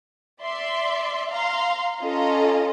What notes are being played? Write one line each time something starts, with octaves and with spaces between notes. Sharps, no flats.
D5 E5 C6
F5 A#5 C6
C#4 F4 A4 D#5 A#5